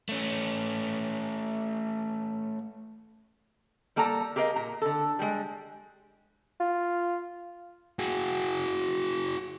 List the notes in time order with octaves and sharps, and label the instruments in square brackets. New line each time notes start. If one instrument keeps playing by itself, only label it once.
[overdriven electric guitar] A3 C#4
[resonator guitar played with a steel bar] G3 A#3 A4 D5 A#5
G4 G#4 A#4 C5 D#5 F5
A#2 A#5
D3 A4
G3 G#3
[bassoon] F4
[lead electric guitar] F#4 G#4